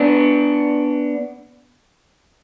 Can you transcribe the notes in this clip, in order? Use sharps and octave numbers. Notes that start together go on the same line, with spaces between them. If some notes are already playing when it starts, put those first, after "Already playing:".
Already playing: B3 D4